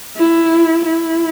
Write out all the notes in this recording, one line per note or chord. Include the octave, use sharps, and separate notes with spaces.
E4
E4